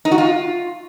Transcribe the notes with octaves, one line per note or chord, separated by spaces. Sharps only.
D#4
F#4
F4